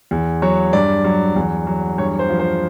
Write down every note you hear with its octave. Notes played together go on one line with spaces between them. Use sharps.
E2
F#3 C#5
G2 D5
F#3
E2
F#3
G2 C#5
C5
F3
C5